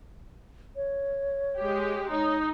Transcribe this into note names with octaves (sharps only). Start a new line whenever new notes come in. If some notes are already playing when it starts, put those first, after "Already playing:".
C#5
G#3 G4
D#4 C#5